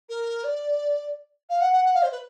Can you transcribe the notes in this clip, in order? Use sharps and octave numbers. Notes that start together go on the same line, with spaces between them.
A#4
D5
F5
F#5
F#5
F#5
F5
C5
B4